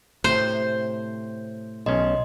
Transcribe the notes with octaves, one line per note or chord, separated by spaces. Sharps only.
A2 C3 C5
B1 C#4 D#5 C6